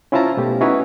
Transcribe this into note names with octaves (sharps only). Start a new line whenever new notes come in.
C#4 E4 F4 C5 A5 A#5
B2 A3 G4
C#4 D#4 E4 F#4 B4 C#5